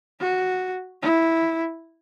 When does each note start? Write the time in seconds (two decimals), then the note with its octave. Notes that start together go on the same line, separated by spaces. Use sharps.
0.20 F#4
1.02 E4